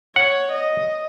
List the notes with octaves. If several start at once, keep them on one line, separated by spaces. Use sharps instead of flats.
C#5 F#5
D#5